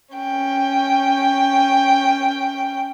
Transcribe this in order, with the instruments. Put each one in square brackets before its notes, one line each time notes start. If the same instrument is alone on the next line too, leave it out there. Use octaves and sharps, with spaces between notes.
[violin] C#4 G5